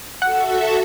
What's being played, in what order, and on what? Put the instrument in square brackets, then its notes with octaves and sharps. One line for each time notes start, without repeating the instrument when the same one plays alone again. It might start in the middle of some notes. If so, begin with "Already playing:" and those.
[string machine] F#4 A4 E5 [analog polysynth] F#5